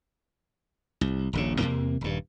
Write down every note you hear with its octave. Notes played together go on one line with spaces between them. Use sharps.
C2
D#1 A#1 C#3
E2 C3 A#3
D#1 G2